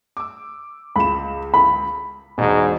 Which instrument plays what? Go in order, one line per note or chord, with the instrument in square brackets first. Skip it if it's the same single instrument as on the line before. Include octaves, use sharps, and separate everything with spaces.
[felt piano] D6 E6
[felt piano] C#2 E7 [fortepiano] B5
[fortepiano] B5
[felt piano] E1 B2 [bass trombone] G#2